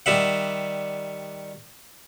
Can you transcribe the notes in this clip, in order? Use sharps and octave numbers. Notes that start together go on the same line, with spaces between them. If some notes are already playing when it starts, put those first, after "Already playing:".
D#3 G3 E5 F#5